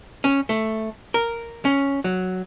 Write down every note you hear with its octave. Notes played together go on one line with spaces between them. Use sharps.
C#4
A3
A#4
C#4
F#3